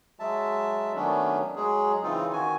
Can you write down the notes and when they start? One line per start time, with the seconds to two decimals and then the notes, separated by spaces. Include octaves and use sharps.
0.19 F#3 G#3 E5 A5
0.95 D#3 F#3 A3 B3 C#4 D4
1.56 F#3 G#3 G#4
2.03 C#3 E3 C4 D#4 F4
2.33 D#3 F#4 G#5